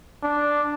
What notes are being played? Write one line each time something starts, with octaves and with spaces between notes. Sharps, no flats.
D4